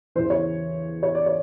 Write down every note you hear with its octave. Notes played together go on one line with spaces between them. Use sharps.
E2 C#3 E3 C5
C#5
C#5
D5
C#5